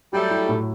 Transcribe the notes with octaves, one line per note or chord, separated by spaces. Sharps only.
F#3 G3 A3
E4
A2